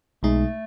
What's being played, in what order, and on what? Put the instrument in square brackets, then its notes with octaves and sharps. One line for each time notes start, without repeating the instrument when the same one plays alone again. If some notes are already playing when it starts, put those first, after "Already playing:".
[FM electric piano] B1 B2 G#3 D#4 [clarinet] A3